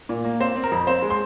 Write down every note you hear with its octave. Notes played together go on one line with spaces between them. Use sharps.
A#2
A#3
C4 C5
C4
A#4
F2
C4 C5
G#3
C6